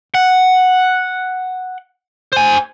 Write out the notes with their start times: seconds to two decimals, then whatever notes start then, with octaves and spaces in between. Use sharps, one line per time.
0.14 F#5
2.33 C5 G#5